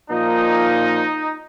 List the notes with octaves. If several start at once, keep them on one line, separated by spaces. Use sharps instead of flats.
A#2 F3 A#3 D#4